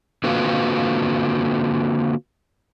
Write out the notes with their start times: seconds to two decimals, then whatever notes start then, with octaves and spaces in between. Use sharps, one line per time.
0.24 D3 A#3 C4 F4 F#4 B4